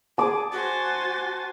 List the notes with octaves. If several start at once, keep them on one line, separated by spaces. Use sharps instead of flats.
G#4 A5 D6
F#4 C5 G#5 A6